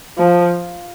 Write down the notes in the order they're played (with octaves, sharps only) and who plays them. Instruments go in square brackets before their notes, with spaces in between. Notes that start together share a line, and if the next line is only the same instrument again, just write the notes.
[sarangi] F3